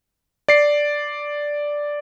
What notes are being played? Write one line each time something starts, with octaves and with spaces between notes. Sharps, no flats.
D5 C7